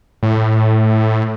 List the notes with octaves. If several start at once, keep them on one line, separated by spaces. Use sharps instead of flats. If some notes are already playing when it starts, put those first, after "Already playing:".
A2